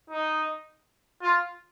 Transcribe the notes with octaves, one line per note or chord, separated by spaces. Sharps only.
D#4
F4